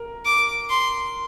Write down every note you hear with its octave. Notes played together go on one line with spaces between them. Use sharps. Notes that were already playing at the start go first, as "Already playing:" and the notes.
Already playing: A#4
D6
C6